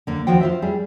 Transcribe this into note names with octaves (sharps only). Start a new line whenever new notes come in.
D#2 D3 A#3
D#2 D#3 F3 F#4 C5 G5
F4 C5 E5
G3 G#4